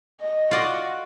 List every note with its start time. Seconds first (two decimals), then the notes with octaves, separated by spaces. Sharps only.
0.21 D#5
0.51 F4 F#4 D5 D#5